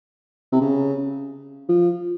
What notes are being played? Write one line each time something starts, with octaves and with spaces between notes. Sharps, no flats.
C3
C#3
F3